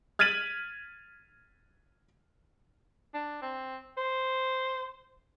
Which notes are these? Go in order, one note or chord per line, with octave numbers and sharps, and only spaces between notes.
F6 G#6 A6 B6 D#7 F#7
D4
C4
C5